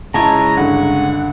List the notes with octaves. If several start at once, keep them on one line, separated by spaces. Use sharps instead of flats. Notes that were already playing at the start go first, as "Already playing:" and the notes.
C#3 G#3 E4 C#5 D#5 A5 A#5
G2 D3 F#5